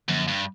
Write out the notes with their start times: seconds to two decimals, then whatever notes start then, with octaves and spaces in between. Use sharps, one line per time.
0.08 F#2 D3 F3 A#3
0.28 G2